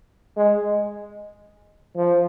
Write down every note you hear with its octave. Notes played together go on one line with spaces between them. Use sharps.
G#3
F3